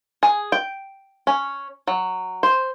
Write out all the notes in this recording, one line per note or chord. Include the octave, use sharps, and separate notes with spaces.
G#4
G5
C#4
F#3
C5